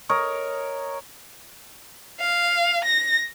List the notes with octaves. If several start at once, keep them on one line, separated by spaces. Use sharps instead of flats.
A#4 C#5 D#5
F5
A#6